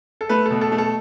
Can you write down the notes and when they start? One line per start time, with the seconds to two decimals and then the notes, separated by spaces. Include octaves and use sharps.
0.21 A4
0.29 A3 B4
0.46 B2 A4
0.61 A4
0.72 A3
0.78 A4